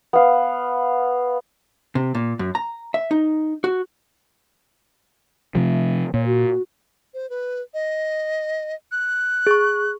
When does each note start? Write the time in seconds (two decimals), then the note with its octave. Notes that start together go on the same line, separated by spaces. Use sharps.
0.13 B3 F5
1.95 C3
2.15 A#2
2.39 F#2
2.55 A#5
2.94 E5
3.11 D#4
3.64 F#4
5.55 C3 F3 A3
6.14 A#2 C#5
6.26 F#4
7.14 C5
7.30 B4
7.74 D#5
8.92 F#6
9.47 G#4 C#6